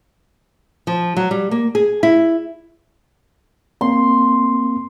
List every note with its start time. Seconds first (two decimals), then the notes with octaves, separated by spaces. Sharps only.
0.87 F3
1.17 F#3
1.31 G3
1.51 A#3
1.75 G#4
2.03 E4
3.81 A#3 C4 C6